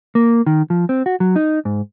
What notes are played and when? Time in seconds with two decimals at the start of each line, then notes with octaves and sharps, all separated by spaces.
0.15 A#3
0.46 D#3
0.70 F3
0.89 C4
1.06 F#4
1.20 F#3
1.36 D#4
1.65 G#2